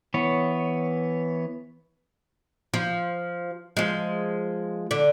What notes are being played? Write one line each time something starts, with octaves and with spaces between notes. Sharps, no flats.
E3 B3 C#5
F3
F3 G#3
D3